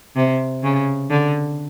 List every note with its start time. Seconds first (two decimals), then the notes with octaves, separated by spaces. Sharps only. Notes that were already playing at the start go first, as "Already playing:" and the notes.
0.16 C3
0.63 C#3
1.10 D3